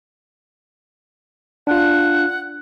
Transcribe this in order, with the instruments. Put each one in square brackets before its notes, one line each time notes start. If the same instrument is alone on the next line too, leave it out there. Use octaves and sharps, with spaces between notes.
[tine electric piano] D4 F4 [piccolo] F#5